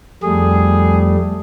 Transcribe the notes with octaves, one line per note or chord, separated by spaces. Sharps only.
F2 G3 A3 G#4